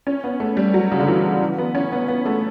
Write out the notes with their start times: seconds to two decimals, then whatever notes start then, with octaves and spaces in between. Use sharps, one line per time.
0.07 C#4
0.24 B3
0.40 A3
0.57 G3
0.74 F#3
0.92 C#3
1.00 D3
1.07 E3
1.42 E3
1.58 B3
1.75 C#4
1.92 B3
2.08 B3
2.26 A3